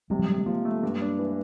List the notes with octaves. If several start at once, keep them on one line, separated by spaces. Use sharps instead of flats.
C3 F#3 G#3
F3 G3
C3 F#3 G#3
G3 A3
F3 G#3 A#3
A3
G2
D4
E3